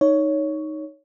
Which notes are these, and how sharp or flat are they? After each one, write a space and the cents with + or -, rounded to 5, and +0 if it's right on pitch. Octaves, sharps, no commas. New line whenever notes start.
D#4 +0 C#5 +10